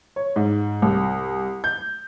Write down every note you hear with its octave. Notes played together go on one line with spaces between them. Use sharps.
C#5
G#2
C2
G6